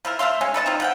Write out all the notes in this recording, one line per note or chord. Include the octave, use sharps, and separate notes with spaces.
F3 E4 A#4
A3 E5 F5 C6
G#3 C#4
A4 B4 D#5 A5
C4 D#4 F4
F3 F#5 G5